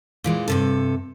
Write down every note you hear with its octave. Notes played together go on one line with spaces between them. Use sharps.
A#2 E3 G#3
G2 C3 A4